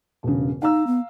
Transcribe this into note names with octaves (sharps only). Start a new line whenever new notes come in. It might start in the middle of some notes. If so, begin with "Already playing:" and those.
E1 G2 C#3
D#4 F5 A#5 E6
B3